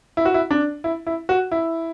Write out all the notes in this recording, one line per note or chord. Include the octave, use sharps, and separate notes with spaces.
E4
F#4
E4
D4
E4
E4
F#4
E4